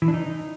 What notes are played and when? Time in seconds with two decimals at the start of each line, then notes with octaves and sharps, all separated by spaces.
0.02 E3
0.08 D4
0.14 D#4